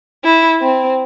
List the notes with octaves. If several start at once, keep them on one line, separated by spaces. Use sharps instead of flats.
E4
C4